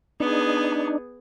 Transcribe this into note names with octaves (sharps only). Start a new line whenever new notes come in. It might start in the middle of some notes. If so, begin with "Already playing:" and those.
B3 D4 D#4 G#4